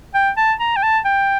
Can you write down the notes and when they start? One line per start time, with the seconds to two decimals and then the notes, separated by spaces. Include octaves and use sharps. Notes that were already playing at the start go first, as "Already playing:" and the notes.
0.14 G5
0.37 A5
0.60 A#5
0.76 G5
0.83 A5
1.05 G5